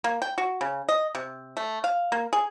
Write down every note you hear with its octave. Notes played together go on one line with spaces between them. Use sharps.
A#3
G5
F#4
C#3
D#5
C3
A3
F5
A#3
G#4